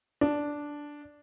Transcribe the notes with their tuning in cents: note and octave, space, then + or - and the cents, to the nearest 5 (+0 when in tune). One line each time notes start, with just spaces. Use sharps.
D4 -5